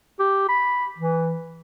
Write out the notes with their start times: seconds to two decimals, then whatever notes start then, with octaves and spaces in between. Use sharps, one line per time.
0.20 G4
0.49 B5
0.98 E3